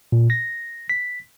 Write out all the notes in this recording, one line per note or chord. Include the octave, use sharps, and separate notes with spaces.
A#2
A#6
B6